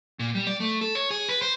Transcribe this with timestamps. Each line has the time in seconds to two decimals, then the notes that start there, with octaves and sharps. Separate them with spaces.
0.19 A#2
0.35 G3
0.47 D5
0.60 A3
0.81 A4
0.95 C#5
1.11 G#4
1.29 B4
1.42 C5